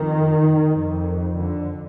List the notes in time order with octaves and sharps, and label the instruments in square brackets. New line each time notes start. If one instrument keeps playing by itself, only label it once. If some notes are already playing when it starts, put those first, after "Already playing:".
Already playing: [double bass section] F2 D#3
F2
D3